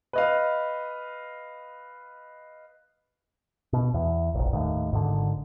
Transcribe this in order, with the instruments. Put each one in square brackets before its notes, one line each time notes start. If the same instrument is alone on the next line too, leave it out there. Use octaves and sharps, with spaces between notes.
[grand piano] B4 D#5 F5
[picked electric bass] B2
E2
E1 A#1
D#2 A2
G#1 G#2 D3